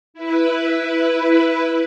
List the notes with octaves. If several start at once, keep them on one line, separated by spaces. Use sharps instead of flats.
E4 B4